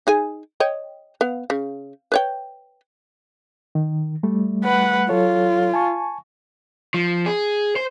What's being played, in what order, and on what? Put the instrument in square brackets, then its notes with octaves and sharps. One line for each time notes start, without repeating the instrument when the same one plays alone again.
[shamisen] D#4 G#4 G#5
C#5 D#5 G5
B3 F5
C#3
B4 C#5 G5
[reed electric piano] D#3
G3 A3
[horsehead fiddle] B4 F#5
[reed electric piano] F#3 A4 C#5 [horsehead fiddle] F4
[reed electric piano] G#5 A5 C#6
[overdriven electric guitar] F3
G#4
C5